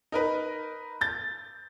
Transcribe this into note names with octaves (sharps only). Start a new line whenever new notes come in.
D#4 A#4 B4
G6 A6